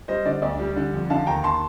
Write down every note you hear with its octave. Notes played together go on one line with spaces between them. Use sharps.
G3 C5 D#5
D3 D5
D2 D5
G3
D3
F2
D3 F5 A5
D#2 G5 A#5
A5 C6